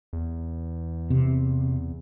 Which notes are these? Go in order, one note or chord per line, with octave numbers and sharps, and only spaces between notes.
E2
C3